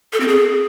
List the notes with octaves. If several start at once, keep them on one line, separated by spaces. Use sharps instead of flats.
A4
C4
G#4